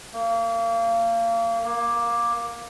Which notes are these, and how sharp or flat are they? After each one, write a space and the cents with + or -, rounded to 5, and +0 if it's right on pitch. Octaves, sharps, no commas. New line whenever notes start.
A#3 -30
A#3 +15